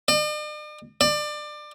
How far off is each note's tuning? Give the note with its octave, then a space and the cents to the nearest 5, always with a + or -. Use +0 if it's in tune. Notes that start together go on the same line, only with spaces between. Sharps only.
D5 +45
D5 +25